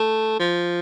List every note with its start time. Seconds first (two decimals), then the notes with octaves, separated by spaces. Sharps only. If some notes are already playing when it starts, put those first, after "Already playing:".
Already playing: A3
0.40 F3